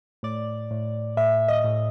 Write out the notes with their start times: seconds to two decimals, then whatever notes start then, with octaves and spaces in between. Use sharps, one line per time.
0.23 A2 D5
0.71 A2
1.17 A2 E5
1.48 D#5
1.64 A2